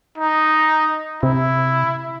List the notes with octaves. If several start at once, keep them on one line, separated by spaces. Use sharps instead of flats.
D#4
C3 E4